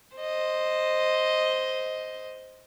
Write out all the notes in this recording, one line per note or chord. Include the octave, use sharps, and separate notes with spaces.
C5 D#5